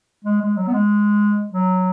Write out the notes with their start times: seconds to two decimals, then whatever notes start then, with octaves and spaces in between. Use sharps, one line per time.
0.25 G#3
0.42 G#3
0.57 F#3
0.68 B3
0.74 G#3
1.53 F#3